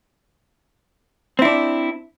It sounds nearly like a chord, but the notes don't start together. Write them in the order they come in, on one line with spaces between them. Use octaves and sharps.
C4 E4 D4